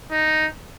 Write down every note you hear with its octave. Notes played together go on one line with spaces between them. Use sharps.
D#4